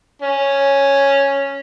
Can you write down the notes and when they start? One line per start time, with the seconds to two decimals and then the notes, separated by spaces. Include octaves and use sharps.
0.22 C#4